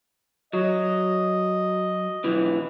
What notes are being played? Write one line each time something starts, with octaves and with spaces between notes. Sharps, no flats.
F#3 D#5
B1 E3